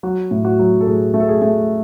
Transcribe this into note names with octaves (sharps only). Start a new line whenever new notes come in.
F#3 F#4
A2
F#4
F#3
A4
A2 G#4
A3
A4
G#4
A3